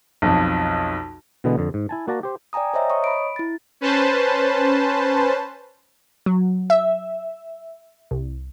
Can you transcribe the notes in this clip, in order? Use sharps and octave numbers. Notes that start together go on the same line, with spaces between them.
B1 F2
B2 D3 E3 G#3 B3
F2 D3
G#2
E4 G#5 A5
A#3 F#4 D5 A5 A#5
G4 C5
D5 G5 G#5 A#5 D#6
C5 C#5 D#5 E5 A#5
C#5 D#5 C#6 D#6
B5 D7
E4 A6
C#4 B4 C5 A5
F#3
E5
C2